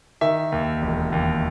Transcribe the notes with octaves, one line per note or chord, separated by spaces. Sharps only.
D#3 E5
D#2
E1
D#2